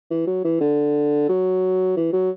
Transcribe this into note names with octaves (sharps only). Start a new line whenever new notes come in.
E3
F#3
E3
D3
F#3
E3
F#3